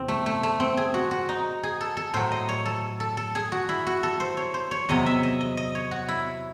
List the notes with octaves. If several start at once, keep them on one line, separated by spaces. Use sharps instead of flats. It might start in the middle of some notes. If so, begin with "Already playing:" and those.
Already playing: E2 C3 C4
A3
A3
A3
C4
G#4
F#4
F#4
D#4
G#4
A4
A4
A2 F#3 C5
D#5
C#5
A4
A4
A4
G#4
F#4
E4
F#4
A4
C5
C#5
C5
C#5
E2 C3 F#3 D#5
E5
D#5
D#5
D#5
C#5
F#4
E4